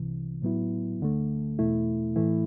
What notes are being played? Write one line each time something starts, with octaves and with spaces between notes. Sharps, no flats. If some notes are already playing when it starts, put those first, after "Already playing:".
Already playing: C2 C3 E3
A2 F#3 B3 E4
D2 D3 A3
E2 B2 A3 E4
A2 E3 A3 E4